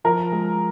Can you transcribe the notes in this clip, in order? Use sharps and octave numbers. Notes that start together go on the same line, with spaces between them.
F3 A#4
G#3